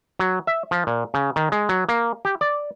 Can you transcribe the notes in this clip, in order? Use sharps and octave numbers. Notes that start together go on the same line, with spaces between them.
F#3
E5
F3
A#2
C#3
D#3
G#3
F#3
A#3
G4
D5